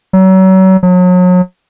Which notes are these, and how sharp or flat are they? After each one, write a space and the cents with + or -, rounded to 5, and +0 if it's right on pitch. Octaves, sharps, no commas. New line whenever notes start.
F#3 +35
F#3 -35